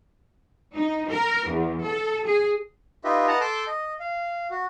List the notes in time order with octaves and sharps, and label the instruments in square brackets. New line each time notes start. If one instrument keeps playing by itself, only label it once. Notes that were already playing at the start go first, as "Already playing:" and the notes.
[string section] D#4
A#4
E2
A4
G#4
[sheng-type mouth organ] D#4 F4 G4 B4 D#5 E5
B4 D#5 F#5 A5 A#5
A4 A5 C6 D6 E6 G6
D#5
F5
F#4